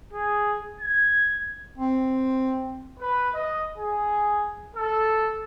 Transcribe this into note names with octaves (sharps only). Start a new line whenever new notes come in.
G#4
G#6
C4
B4
D#5
G#4
A4